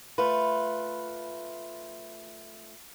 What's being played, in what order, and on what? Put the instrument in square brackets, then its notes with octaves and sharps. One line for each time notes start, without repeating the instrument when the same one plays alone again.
[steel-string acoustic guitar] A3 F4 B4